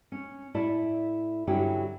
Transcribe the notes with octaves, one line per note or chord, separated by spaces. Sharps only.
C#4
A2 A3 E4 D5 E5 A5
G2 D3 F#3 C#4 E4 G4